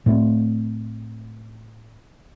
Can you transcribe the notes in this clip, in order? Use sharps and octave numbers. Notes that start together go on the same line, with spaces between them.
A2 A3 B3 C4